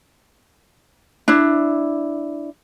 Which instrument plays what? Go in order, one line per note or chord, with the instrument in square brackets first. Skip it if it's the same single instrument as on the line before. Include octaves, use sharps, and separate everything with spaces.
[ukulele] D4 E4